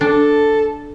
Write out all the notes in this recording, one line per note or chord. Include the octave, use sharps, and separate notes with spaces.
D4 A4